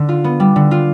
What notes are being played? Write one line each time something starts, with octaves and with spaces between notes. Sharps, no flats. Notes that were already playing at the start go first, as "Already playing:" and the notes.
Already playing: D3
F4
B3
G3
D3
F4